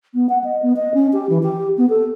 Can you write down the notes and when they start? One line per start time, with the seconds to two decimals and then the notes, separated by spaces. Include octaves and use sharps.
0.14 B3
0.29 F#5
0.44 D#5
0.62 B3
0.76 D#5
0.94 C#4
1.13 G4
1.29 E3
1.43 G4
1.78 B3
1.89 A4